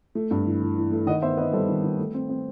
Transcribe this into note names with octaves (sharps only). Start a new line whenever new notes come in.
A3
G2
E3
E3
E3
A3
D#3 D#5 F#5
B3 C5 E5
B3 B4 D#5
G3 A4 C5
D#3
D#3
A3
C4
C4